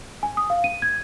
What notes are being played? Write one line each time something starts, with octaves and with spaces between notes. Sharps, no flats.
G#5
D#6
F5
D#7
G#6